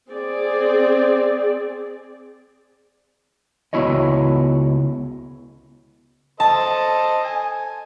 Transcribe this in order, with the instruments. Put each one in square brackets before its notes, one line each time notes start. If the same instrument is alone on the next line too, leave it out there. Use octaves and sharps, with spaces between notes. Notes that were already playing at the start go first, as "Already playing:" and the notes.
[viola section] C4 G#4 D5
[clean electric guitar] C#2 B3 E4 F#4 C#5 D#5
[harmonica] A4 C5 D#5 [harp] A5
[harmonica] G#5